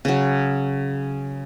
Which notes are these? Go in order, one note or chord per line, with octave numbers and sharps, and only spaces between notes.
C#3 F#3